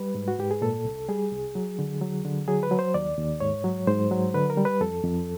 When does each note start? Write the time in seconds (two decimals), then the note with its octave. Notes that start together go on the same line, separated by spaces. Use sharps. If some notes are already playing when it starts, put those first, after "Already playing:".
Already playing: G3 B4
0.15 G#2
0.28 F#4
0.39 G#2 G4
0.51 G#4
0.62 A#2 A4
0.85 C2
1.08 G3 G#4
1.32 C2
1.55 F#3
1.79 D3
2.01 F#3
2.25 D3
2.48 F#3 G#4
2.63 B4
2.71 F#3
2.79 C5
2.94 D#2 D5
3.18 D#2
3.40 G#2 C#5
3.64 F#3
3.87 G#2 C5
4.11 F#3
4.34 D3 B4
4.50 A#4
4.57 G3
4.65 B4
4.81 F2 A4
5.04 F2